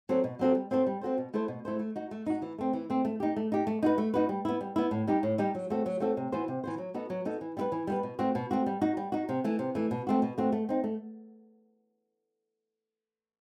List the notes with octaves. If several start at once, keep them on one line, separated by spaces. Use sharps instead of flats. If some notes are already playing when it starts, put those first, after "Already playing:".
F#3 C4 F#4 A4
B2
F#3 C4 F#4 A4
G3
C4 F#4 A4 C5
G3
C4 F#4 A4 C5
B2
A3 E4 A4 C5
B2
A3 E4 A4 C5
A3
D#4 F#4
A3
D#4 F#4
E3
A3 C4
E3
A3 C4
A3
D#4 G4
A3
D#4 G4
A3
D#4 F#4 B4
A3
D#4 F#4 B4
G3
B3 E4
G3
B3 E4
A2
G3 D#4 G4
A2
G3 D#4 G4
F#3
A3 C4 F#4 A4
F#3
A3 C4 F#4 A4
C3
E3 B3 F#4 C5
C3
E3 B3 F#4 C5
F#3
B3 D#4 F#4 A4
F#3
B3 D#4 F#4 A4
E3
G3 B3 E4 B4
E3
G3 B3 E4 B4
B2
A3 C4 F#4
B2
A3 C4 F#4
G3
D#4 F#4
G3
D#4 F#4
C3
E3 A3
C3
E3 A3
B2
A3 C4 F#4
B2
A3 C4 F#4
A3
C4 D#4
A3